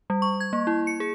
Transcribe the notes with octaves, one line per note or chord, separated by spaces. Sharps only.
G3
C#6
G#6
A#3
E4
C#7
G#4